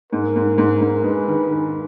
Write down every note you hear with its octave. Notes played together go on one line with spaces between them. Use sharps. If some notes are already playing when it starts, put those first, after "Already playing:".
G#2 A#4
G#2
G#2
G#2
G#3 B4
D#3
D#3